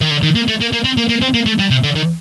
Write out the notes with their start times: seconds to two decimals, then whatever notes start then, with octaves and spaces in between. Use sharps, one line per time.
0.01 D#3
0.11 D3
0.23 D#3
0.35 A#3
0.48 A3
0.61 A#3
0.73 A#3
0.84 C4
0.97 A#3
1.09 A#3
1.22 C4
1.34 A#3
1.46 A3
1.59 G3
1.71 C3
1.84 D3
1.95 D#3